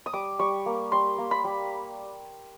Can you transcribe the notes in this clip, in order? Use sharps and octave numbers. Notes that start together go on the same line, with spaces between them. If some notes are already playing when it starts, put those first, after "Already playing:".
D#6
G3 D6
G3 C#6
A#3
G3 C6
A#3
B5
G3